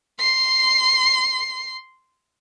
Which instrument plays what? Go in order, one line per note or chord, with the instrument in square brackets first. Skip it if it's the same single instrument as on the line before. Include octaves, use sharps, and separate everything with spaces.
[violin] C6 C7